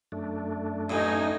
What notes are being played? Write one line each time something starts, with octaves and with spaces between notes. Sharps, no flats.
F#2 A3 D4
A1 A2 D#4 G#5